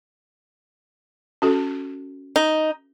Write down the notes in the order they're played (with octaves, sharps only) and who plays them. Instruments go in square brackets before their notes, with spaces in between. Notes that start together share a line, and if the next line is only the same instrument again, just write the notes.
[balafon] C#4 F#4 A4
[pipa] D#4